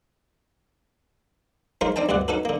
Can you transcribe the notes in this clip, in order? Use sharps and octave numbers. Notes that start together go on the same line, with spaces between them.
G#3 D#4 F4 A#4 C5 C#5
C4 D4 D#4 G5 A5
D2 G2 C3 D5 F#5
C#4 D#4 F#4 A4 B4
D3 A#3